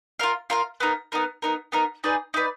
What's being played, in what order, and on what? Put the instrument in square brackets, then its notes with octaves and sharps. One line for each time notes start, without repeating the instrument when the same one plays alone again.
[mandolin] F4 A#4 F5
F4 A#4 F5
B3 D#4 A#4
B3 D#4 A#4
B3 D#4 A#4
B3 D#4 A#4
D#4 G#4 B4 D5
D#4 G#4 B4 D5